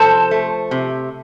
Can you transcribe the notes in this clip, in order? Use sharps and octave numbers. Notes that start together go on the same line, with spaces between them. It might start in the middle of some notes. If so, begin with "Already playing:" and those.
Already playing: C3 F3 A4 C5
A3
C3